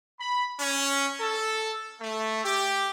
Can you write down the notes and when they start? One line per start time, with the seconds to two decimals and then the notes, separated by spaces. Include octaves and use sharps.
0.19 B5
0.59 C#4
1.20 A4
2.00 A3
2.44 G4